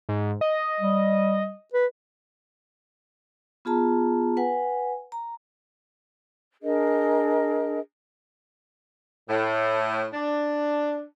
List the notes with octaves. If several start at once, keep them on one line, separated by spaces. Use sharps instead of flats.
G#2
D#5
G3
B4
B3 F4 G#4 A5 A#5
B4 F#5 G#5
A#5
D4 G#4 A#4 D#5
A2
D4